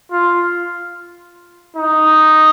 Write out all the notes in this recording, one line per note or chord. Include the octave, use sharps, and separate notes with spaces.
F4
D#4